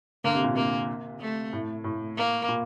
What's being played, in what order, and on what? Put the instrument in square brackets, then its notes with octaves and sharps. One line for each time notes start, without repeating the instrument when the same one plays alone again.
[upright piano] D3 [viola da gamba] A#3
[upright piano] C3
A#2
[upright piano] C3 [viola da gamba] A#3
[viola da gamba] A3
[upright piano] A2
A2
[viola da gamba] A#3
[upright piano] A#2